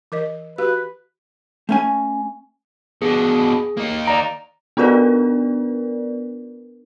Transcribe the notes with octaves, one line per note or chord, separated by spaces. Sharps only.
E3 A#4 D#5
F#4 G4 B4 F5
A3 C#4 G#5
B2 D4 G#4
A#3 D#4
D5 A#5 D7
B3 D4 F4 A#4 B4 D5